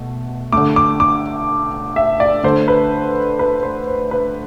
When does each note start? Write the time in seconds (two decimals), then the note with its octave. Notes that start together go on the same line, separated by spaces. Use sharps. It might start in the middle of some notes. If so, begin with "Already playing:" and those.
Already playing: B2 A3
0.52 D3 A3 D6
0.76 D6
1.00 D6
1.96 E5
2.20 D5
2.43 D3 A3 C5
2.68 B4
3.39 B4
3.63 C5
3.87 C5
4.11 B4